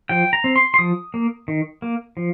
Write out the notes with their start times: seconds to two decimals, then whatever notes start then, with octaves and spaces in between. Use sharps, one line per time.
0.09 F3 G5
0.33 A#5
0.44 C4
0.56 C6
0.74 C6
0.79 F3 D#6
1.14 A#3
1.48 D#3
1.82 A#3
2.17 F3